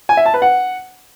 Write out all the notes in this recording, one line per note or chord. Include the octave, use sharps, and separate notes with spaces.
G#5
E5
A5
B4
F#5